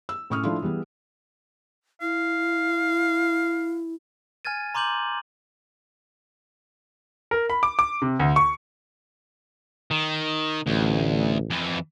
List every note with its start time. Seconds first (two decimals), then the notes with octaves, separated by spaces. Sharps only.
0.09 E6
0.30 A2 C#4 C#6 D#6 F6
0.43 F3 A3 D4 E4 F4
0.62 E3 G3 B3 G#4
2.02 E4 F5
4.45 G#5 F6 G#6 A6 D#7
4.74 A#5 C6 D6 G6 F#7
7.31 A#4
7.50 B5
7.63 D6
7.79 D6
8.02 C3
8.19 D2
8.36 C#6
9.91 D#3
10.66 A1 D2
11.50 F2 E3